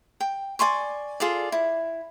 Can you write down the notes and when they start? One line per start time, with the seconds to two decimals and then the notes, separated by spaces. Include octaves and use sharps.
0.20 G5
0.59 D5 G#5 C6 C#6
1.20 F4 G#4 A4 D5
1.52 E4